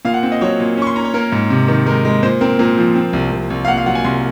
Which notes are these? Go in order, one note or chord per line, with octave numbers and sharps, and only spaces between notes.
A#2 F5
F#5
C4
D#5
F#3 C#5
A#2
C#4 C#6
C6
C#4 A#5
C#5
A#3 A#4
G#2
C3
D#3
G#3 A#4
G#3
A#2 C5
C4 A#4
A#2 A#4
F3
C4
C2
C2
C2
F5
A#2 F#5
F5
F#3 F#5
G#5
C2 C6